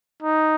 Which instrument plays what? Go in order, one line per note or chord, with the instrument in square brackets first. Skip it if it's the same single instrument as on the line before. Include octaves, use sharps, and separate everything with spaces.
[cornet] D#4